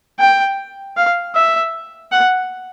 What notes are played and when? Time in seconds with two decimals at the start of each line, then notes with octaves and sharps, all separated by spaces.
0.19 G5
0.97 F5
1.35 E5
2.12 F#5